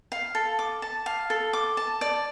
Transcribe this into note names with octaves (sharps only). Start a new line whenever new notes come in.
F5
A4
D6
A5
F5
A4
D6
A5
D5